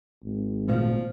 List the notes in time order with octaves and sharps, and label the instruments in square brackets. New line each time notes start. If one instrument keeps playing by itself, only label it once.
[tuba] G#1
[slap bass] A#2 C#3 A3 [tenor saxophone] F3